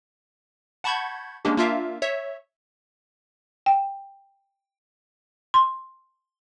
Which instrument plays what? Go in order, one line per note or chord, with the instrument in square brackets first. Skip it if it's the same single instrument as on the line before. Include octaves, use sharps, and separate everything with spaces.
[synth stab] F#5 A5 B5 C#6 G6 G#6
G#3 A#3 C#4 D4 G4
A#3 D4 F4 A#4 E5 F5
C#5 E5
[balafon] G5
C6